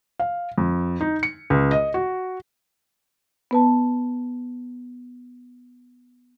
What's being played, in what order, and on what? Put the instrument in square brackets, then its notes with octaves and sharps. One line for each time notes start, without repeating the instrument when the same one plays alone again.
[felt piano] F5
F2
D#4
C#7
C#2
D#5
F#4
[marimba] B3 B4 A5